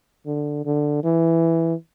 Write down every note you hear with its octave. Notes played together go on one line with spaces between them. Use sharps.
D3
D3
E3